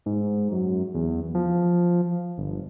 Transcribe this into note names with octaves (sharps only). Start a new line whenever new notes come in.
G#2
F#2
E2
F3
G1